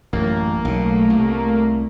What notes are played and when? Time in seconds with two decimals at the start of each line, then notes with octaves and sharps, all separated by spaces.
0.13 A1 F#2 A#3
0.65 B1 C#3 A3
1.10 C2